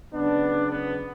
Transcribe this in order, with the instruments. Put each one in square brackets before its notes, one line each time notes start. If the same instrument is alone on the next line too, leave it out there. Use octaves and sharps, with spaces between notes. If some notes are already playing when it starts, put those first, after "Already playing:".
[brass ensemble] C#3 F#3 B3 D4
B3